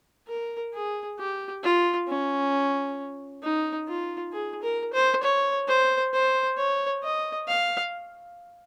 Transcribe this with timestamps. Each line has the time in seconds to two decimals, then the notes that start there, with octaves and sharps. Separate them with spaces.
0.27 A#4
0.73 G#4
1.19 G4
1.63 F4
2.09 C#4
3.43 D#4
3.88 F4
4.33 G#4
4.62 A#4
4.93 C5
5.23 C#5
5.68 C5
6.13 C5
6.57 C#5
7.03 D#5
7.48 F5